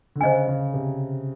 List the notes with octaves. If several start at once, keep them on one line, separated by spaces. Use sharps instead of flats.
D3
C#3 C5 D#5 G#5
C#3
C3